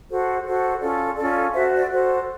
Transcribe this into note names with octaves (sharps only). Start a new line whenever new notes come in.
F#4 A4 C5
F#4 A4 C5
C#4 F4 A4 D5
C#4 F4 A4 D5
F#4 A4 C5 E5
D5
F#4 A4 C5